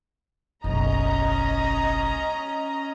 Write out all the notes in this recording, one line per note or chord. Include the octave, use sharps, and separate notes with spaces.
F#1 B1 C#4 D#5 A#5